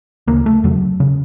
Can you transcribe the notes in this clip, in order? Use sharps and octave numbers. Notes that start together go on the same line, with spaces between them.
D2 C#3 A#3
A3
E2 C#3 F#3
C#3